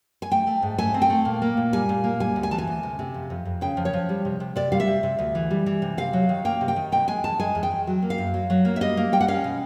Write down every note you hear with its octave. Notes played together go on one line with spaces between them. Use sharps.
G#5
A3 G5
A3
G#2
A3 G#5
C4
G5
A3
A#2
A#3
A#2
G3 G#5
A#2
A#3
G3 G#5
D2
G#5
E3 A5
G#5
D2
C3
C3
F2
F2
F2
C#3 G5
F3
C#5
F3
G3
C3
C3
C3 D5
G3 F5
E5
C3
C3
D2
E3
G3
E3
C3
C3 F5
F#3
D#3
A#3 G5
C3
G5
D#3
B2 G5
G#3 G#5
E2 A5
G#3 G#5
E2
G5
E2
F#3
A#3
F5
F#2
F#3
F#3
A#3
E5
G3 D#5
A#3
G3 G5
F#5
C#4 F5
B2